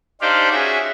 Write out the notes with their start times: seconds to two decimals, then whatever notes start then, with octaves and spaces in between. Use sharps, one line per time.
0.21 D4 D#4 G4 C5 D5 F5
0.51 C#4 F#4 G#4 E5